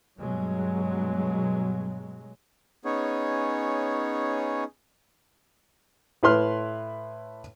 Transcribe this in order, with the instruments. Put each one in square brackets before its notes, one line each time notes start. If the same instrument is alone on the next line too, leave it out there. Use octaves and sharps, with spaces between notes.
[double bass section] G2 B2 F#3 G#3
[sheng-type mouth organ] B3 C#4 D#4 G#4 C#5
[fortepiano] A2 E4 B4 C6 F6